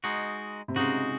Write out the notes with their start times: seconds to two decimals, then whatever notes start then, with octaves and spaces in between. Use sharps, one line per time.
0.04 G#3 D#4 F#4
0.68 C3
0.76 C#3 G#3 D#4 F#4